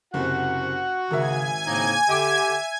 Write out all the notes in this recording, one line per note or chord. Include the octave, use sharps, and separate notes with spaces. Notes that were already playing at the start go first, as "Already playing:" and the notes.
F#1 C3 F#4 F#5
G#1 C#3 A#4 E5 G#5 G#6
A2 C#3 A#3 C4 D#4
D3 G4 E5 G5 D6 D7